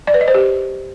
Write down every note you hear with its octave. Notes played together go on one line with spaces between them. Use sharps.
D5
B4
D#5
C5
G4